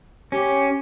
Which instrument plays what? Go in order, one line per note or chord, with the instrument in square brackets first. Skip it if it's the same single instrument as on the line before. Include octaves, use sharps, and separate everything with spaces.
[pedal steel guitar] C#4 [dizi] G4